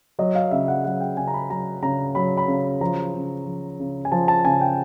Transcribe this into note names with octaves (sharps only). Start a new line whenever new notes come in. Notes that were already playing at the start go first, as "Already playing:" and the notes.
F#3 D#5
F5
C#3 E5
F#5
F#3 F#5
G5
C#3 G#5
A#5
B5
F#3 A#5
C#3 A#5
F#3 B5
B5
C#3
F3 A#5
C#3
F3
C#3
G#5
F3 A5
A5
C#3 G#5
G5